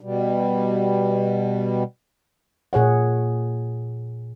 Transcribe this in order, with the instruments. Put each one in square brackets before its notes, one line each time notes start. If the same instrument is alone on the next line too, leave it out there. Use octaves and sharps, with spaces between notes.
[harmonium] B2 G3
[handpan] A#2 G#4 C#5 F#5